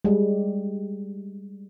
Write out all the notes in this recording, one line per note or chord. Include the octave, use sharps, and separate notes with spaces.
G3 G#3